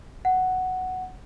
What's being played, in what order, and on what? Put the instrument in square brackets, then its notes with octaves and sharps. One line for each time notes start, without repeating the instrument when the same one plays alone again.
[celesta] F#5